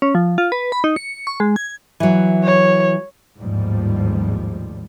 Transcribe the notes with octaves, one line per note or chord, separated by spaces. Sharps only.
C#4
F3
F4
B4
B5
D#4
C#7
C#6
G#3
G#6
E3 F#3
C#5
A1 D#2 G#2 F3 G3